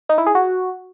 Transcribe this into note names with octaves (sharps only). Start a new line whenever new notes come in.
D#4
E4
G#4
F#4